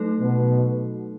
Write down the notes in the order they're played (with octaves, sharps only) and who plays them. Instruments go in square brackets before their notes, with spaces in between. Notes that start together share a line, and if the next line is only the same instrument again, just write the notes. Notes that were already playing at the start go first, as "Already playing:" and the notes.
Already playing: [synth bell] F#3 A3 D#4 A4
[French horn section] B2